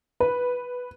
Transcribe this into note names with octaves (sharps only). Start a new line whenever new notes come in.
B4